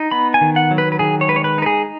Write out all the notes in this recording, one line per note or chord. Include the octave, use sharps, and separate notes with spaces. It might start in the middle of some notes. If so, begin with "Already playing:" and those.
Already playing: D#4
B3 B5
G#5
D#3
F#5
F#3
B4
B4
D#3 G#4
C#5
G#3 B4
C#5
B4
D#4 B4
G#4